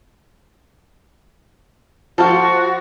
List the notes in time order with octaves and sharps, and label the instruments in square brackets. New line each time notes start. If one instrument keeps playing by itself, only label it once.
[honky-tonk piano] F3 [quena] F#4 [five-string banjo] A4 C5 F5